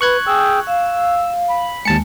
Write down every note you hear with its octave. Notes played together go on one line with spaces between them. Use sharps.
B4 C#6 F#6 G#6
G#4 G5 E6
F5 E6
F5
B5
D#2 G#3 A5 C#7